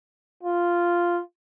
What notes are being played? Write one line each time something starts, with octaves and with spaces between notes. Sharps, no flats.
F4